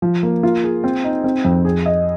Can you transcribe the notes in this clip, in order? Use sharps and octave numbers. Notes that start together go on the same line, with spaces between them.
F3
A#3
F4
G#4
C4
D#4
C4
F2
G#4
D#5